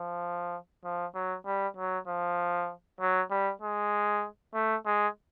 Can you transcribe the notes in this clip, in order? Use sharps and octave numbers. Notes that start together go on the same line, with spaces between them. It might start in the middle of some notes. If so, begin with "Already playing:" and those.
Already playing: F3
F3
F#3
G3
F#3
F3
F#3
G3
G#3
A3
G#3